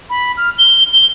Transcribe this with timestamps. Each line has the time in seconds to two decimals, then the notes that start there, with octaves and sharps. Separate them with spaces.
0.10 B5
0.37 F6
0.58 G7
0.93 G7